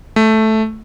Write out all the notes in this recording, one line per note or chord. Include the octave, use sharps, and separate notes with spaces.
A3